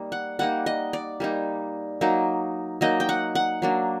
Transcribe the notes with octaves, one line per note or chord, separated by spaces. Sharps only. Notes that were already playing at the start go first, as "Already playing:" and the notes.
Already playing: G3 A#3 D#4
F#5
G3 A#3 D#4 F#5
D#5
D5
G3 A#3 D#4
F#3 A#3 D#4
F#3 A#3 D#4 D#5
G5
F#5
F#5
F#3 A#3 D4